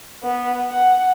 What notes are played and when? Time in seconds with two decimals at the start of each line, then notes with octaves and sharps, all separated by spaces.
0.23 B3
0.71 F#5